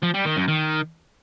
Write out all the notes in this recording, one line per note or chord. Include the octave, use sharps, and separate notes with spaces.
F3
G3
D#3
F#2
D#3